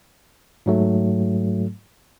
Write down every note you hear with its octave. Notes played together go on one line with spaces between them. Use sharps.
G#2 F#3 A3